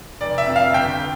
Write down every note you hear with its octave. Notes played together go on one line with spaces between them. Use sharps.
F1 D5
E5
F2
F5
G1 G5